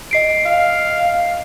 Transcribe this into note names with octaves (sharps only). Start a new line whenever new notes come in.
D#5 C7 D7
F5